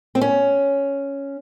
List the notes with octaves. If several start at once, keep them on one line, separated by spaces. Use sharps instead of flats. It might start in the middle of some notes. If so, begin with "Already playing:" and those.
C4
C#4